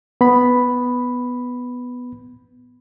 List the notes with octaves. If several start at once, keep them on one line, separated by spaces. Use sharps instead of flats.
B3 B5